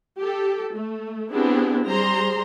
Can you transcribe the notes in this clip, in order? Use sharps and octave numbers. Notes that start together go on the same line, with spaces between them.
G4 A4
A3
B3 C4 D4 E4 G4 G#4
G3 G#4 C5 A#5 C6